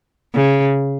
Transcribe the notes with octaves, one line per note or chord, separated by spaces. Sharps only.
C#3